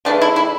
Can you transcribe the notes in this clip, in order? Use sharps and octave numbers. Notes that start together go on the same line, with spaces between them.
C#3 E3 A3 D4
E4
E4